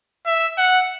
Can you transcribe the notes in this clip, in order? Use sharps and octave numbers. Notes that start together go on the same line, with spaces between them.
E5
F#5